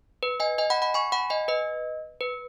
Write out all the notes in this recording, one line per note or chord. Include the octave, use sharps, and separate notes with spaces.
B4
D#5 G#5
D#5 G#5
F#5 B5
F#5 B5
G#5 C#6
F#5 B5
D#5 G#5
B4 D#5
B4